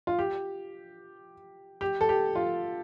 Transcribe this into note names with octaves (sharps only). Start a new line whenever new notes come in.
F4
G4
G4
A4
G4
F4